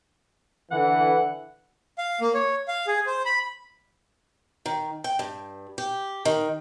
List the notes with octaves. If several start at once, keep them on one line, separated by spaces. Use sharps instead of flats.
D3 E3 F#5
F5
A#3
C#5
F5
G#4
C5
B5
D#3
G5
G2
G4
D#3